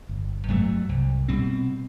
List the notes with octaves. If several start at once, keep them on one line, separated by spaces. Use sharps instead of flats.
G1
G2 F#3 A3
C2
B2 G3 C4